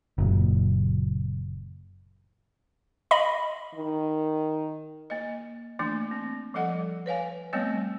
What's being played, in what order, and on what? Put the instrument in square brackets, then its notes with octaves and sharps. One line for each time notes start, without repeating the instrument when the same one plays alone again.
[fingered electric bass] F#1 A#2
[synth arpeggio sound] D#5 B5
[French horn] D#3
[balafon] A#3 D#5
E3 A3 A#3 D4 C6
C4
F3 G3 A4 D#5 F#5
B4 C#5 F5 G#5
G3 A3 B3 C4 C#5 D#5